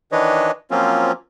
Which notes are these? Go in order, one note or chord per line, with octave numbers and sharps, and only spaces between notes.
D#3 E3 D4 B4 C#5 D#5
F3 F#3 A#3 C4 C#4 F4